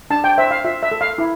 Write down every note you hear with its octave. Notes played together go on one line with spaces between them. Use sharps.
D4 A5
G5
C5 E5
F5
F4 E5
E5
A4
F5
E4